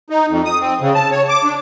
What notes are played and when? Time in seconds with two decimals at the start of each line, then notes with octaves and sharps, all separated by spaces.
0.10 D#4
0.29 F2
0.45 D#6
0.61 C4
0.81 C#3
0.95 A5
1.11 C#5
1.29 D6
1.44 D4